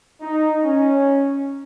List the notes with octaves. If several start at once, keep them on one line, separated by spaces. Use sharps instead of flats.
D#4
C#4